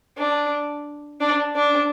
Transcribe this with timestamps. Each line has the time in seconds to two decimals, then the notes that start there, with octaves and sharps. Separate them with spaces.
0.18 D4
1.20 D4
1.55 D4